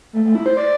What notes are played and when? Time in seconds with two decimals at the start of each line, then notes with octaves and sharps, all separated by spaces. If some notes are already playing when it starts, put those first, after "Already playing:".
0.13 A3
0.24 A3
0.35 E4
0.46 C5
0.57 D5